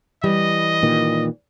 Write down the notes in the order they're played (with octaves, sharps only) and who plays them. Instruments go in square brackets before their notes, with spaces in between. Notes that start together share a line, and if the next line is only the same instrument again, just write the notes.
[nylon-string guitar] E3 G3 [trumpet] D#5
[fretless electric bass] A#2 D#3